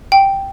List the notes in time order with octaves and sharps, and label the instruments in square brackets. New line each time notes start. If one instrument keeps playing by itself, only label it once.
[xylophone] G5